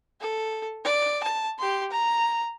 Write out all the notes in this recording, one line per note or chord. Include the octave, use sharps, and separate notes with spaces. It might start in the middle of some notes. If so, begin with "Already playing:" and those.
A4
D5
A5
G4 C6
A#5